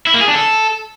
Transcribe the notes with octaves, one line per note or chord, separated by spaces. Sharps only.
E4
A#3
G#4
D4
A4